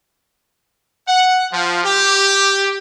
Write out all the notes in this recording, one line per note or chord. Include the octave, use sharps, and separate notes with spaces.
F#5
F3
G4